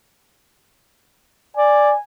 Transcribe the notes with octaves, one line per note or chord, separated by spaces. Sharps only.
D5 G#5